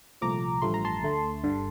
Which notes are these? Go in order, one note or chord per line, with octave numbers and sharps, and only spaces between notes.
C2 A#2 F3 A3 A#5 D6
A1 G2 F3 A3 C6
A#5
A5 C6
D2 D3 A3
G1 G2 D3